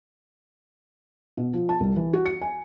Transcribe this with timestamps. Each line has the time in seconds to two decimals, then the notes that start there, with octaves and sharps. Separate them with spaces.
1.37 B2
1.53 F3
1.69 A5
1.80 C2
1.96 E3
2.13 F#4
2.26 C#7
2.41 G#5